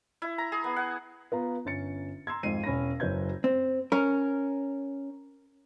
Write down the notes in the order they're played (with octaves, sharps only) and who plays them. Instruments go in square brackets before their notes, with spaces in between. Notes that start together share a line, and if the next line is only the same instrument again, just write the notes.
[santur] E4
A#5
G#4
B3
F#5
[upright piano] B3 F4 A#5
G1 C#4 A6 C#7
A#5 C6 E6 G#6
G#1 F2 G#2 C7 D#7
E1 C#4 B5 A#6
F#1 F#3 B4 C#5 G6 G#6
[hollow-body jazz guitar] C4
[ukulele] C#4 [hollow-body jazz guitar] A#4